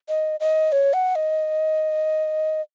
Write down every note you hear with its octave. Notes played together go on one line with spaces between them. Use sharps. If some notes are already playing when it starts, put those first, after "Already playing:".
D#5
D#5
C#5
F#5
D#5